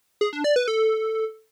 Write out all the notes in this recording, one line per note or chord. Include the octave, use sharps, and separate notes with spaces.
G#4
D4
D5
B4
A4